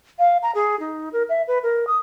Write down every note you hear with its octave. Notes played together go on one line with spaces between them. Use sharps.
F5
A#5
G#4
D#4
A#4
E5
B4
A#4
D#6